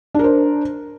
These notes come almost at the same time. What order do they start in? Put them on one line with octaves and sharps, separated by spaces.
D4 A#4 C5